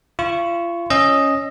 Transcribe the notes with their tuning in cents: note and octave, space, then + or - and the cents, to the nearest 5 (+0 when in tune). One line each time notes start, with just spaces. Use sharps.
F4 -35 C#6 +0
C#4 +0 D#5 +0 E6 +20